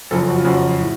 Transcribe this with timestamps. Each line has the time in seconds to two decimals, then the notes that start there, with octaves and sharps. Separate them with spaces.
0.11 F#1 F2 C#3 F3 A4
0.28 F#4
0.37 F4
0.44 F#1 F2 C#3 F3 F#4
0.81 A2